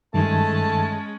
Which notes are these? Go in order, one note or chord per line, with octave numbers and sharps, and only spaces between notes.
G2 D#3 G#3 A3 C#4 A5